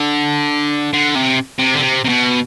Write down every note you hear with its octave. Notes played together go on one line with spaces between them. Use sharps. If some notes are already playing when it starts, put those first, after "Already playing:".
Already playing: D3
D3
C3
C3
D3
C3
C3
B2